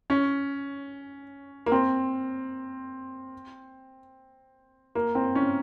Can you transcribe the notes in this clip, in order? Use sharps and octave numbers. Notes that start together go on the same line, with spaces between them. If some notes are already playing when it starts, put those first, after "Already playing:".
C#4
A#3
C4
A#3
C4
C#4